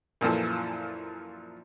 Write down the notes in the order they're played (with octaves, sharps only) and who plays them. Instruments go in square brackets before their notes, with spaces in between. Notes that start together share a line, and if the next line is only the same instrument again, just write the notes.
[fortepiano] F#2 A#2 E3 F3 A4